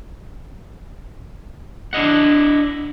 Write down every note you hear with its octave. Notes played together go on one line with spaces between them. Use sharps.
D4 E4 D#5 F#5